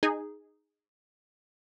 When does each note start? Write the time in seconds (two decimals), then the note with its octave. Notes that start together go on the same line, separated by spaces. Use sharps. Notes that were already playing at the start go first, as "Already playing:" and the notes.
0.03 D#4 G#4